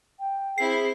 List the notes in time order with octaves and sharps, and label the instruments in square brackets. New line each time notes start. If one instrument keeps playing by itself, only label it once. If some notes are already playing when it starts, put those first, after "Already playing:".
[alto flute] G5
[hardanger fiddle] C4 E4 [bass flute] G#4 [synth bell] C7